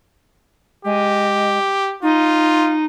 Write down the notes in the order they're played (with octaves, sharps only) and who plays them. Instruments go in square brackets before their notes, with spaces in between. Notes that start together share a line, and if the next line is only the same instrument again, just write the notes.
[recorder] G#3 [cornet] G4
[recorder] D#4 [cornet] F4